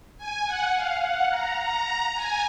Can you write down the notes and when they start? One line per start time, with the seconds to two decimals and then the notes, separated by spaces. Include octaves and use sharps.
0.18 G#5
0.46 F#5
0.75 F5
1.02 F#5
1.30 A#5
1.59 A#5
2.15 G#5